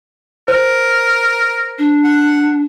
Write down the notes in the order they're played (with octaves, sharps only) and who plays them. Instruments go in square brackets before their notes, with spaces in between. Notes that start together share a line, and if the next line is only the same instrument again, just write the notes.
[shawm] A#4 [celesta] C5
[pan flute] D4
[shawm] F#5